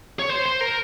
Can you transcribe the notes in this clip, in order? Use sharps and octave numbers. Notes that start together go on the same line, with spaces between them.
C#5
C5
C5
A#4